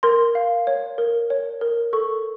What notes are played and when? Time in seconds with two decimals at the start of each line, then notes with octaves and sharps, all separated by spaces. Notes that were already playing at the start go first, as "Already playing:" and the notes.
0.03 A#4 C6
0.35 F5
0.67 C#5
0.98 A#4
1.30 C#5
1.61 A#4
1.93 A4 C#6